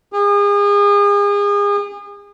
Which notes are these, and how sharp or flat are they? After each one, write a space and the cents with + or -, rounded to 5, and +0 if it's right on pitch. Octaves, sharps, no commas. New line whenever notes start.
G#4 -35